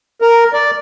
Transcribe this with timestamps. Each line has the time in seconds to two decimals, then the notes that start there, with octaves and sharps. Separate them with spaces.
0.21 A#4
0.53 D5